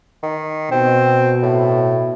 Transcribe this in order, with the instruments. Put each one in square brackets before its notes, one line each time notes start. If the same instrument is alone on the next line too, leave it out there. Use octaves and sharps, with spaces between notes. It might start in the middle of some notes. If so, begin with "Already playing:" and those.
[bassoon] D#3
[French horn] B2 [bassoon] C4
[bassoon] A2